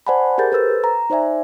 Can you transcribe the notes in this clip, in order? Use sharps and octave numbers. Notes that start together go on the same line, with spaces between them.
C5 D5 F#5 G#5 A5 B5
G4 G#4 A#4 G6 A6
A4 B4 C5 E6 A6
A#5
D#4 C5 D5 E5 G#5